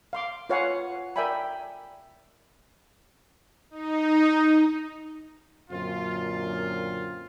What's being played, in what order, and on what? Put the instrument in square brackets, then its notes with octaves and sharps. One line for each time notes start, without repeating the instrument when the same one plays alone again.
[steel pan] F5 C6 D6
F4 B4 C#5 F5 F#5 G#5
A#4 D5 E5 G5 G#5 B5
[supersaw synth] D#4
[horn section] F#2 A#2 D3 C4 F4